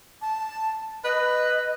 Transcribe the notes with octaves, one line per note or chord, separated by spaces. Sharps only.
A5
B4 D#5